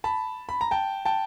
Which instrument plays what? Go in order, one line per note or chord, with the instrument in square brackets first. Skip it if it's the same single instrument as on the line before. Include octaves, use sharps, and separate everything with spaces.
[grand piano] A5 B5
B5
A#5
G5 A5
G5 A5